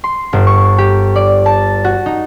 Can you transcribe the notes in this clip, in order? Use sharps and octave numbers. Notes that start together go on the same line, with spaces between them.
C6
G1
C#6
G4
D5
A5
F#4
D#4